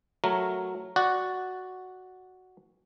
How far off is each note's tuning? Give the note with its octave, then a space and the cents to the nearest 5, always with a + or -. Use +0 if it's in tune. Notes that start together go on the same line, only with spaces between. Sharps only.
F#3 +0 A3 +0 A#4 +0
F#4 +0 D5 +0 F#5 -5